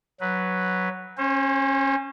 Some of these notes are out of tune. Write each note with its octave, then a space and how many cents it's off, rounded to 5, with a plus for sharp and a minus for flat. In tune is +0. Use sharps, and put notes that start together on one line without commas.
F#3 +0 B4 +0
C#4 -25 C5 +25